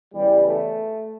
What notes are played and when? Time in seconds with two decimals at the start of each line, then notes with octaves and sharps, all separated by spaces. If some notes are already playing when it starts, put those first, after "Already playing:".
0.14 E2 C#3 E3 G3
0.47 A3